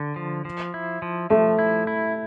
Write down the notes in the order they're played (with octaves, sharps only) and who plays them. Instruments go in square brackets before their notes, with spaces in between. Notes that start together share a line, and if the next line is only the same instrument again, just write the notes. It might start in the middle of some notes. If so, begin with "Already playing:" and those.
Already playing: [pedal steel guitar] D3
F3
F3
E4
F3
[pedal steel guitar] F3 [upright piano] A3
[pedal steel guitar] E4
E4